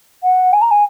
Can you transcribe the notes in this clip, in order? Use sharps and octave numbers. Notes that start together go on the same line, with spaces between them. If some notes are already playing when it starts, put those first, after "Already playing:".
F#5
G#5
A#5
G#5